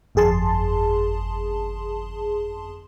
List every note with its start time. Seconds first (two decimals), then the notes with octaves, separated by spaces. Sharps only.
0.15 G1 F2 G#4 A5 C6